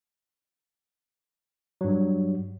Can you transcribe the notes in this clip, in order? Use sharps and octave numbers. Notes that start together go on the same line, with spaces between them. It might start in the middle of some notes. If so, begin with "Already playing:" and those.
G2 F#3